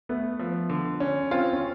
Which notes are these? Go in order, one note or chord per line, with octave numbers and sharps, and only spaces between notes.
A3 B3
F3
D3
C#4
C4 F4
C#4